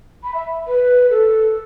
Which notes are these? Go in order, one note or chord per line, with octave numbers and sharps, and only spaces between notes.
B5
E5
B4
A4